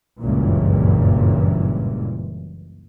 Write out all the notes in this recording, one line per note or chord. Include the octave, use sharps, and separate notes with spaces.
F#1 C#2 G2 A#2 E3